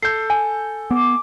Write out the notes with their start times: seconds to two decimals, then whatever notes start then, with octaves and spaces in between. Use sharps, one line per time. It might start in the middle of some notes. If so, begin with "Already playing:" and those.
0.02 A4 G6 C7
0.30 G#5
0.91 B3 D6